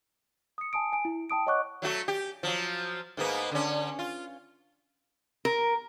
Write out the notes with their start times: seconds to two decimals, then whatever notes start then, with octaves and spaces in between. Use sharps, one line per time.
0.58 D#6 C#7
0.73 G#5 A5 D#6 D7
0.93 G#5 D7
1.05 E4
1.30 G5 A5 D#6 D7
1.47 C#5 D#5 F#5 C#6 D6 F#6
1.82 F#3 A3 F#4
2.08 G4
2.43 F3 F#3
3.17 G#2 A#3 B3
3.52 D3 C#4
3.99 F4
5.45 A#4